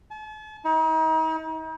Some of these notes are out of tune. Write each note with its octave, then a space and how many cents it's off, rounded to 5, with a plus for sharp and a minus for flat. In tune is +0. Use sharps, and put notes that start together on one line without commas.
A5 -45
D#4 +40